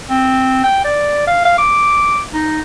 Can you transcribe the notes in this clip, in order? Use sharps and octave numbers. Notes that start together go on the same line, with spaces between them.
C4
G5
D5
F5
F5
D6
D#4